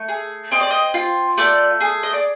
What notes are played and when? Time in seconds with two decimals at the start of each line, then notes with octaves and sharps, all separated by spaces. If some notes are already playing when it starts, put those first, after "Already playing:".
Already playing: A3
0.08 G#4
0.51 C4 D#5
0.61 D5
0.71 D#5
0.94 F4
1.38 A3 D5
1.81 G#4
2.03 D#5
2.13 D5